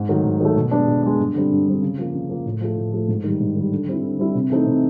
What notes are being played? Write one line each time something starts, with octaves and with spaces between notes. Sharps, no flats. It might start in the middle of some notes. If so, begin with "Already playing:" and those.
Already playing: G#2
D#3 F#3 A3
G#2
D#3 F#3 A3
B2
G#3 B3 D4
B2
G#3 B3 D4
G2
D3 G3 C4
G2
D3 G3 C4
C#3
F3 A#3
C#3
F3 A#3
A2
F3 A3
A2
F3 A3
G#2
D#3 G3
G#2
D#3 G3
D3
G3 C4 E4
D3
G3 C4 E4
C3
E3 A3 C4 D#4
C3